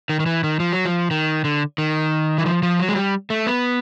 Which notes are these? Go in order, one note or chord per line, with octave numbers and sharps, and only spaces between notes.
D#3
D#3
E3
D#3
F3
F#3
F3
D#3
D3
D#3
E3
F3
F3
F#3
G#3
G3
A3
B3